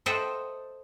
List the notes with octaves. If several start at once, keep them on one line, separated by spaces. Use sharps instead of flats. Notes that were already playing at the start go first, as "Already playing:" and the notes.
A4 C5 D#5 E5 F#5 G5